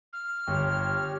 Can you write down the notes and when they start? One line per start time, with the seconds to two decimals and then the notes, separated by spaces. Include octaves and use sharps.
0.13 F6
0.48 G1 G4 C#5